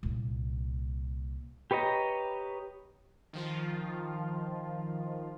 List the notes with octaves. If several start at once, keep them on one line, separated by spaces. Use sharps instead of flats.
C2 A#2
G4 B4 C#5 D#5 A#5
D#3 F3 F4